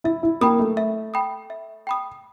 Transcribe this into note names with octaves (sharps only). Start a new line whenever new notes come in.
E4 E5
E4
A#3 G5 B5 D#6
A3
E5
G5 B5 D#6
E5
G5 B5 D#6